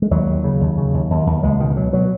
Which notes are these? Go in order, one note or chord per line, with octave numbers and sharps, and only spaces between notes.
G#3
D#2 F#3
D#2
C#3
D#2
C#3
D#2
D#2
D#2
C#2 G#3
B2 D#3
B2 F#3
B2 F#3